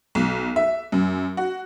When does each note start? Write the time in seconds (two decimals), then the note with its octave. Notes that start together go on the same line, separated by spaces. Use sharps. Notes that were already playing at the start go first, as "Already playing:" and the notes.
0.15 B1
0.56 E5
0.92 F#2
1.37 F#4